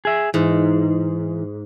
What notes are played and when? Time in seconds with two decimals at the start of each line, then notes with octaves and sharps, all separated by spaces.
0.05 G#4 E5
0.34 G#2 E3